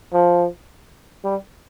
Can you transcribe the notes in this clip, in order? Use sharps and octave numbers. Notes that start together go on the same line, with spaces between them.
F3
G3